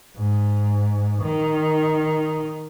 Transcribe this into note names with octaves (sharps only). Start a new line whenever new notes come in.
G#2
D#3